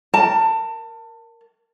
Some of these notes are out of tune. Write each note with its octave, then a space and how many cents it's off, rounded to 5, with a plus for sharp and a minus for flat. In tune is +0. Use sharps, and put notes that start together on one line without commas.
A#4 +0 A5 +25